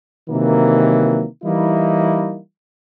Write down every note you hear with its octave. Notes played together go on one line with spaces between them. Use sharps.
C3 D#3 E3 F#3 A#3
E3 G3 A#3 D#4 E4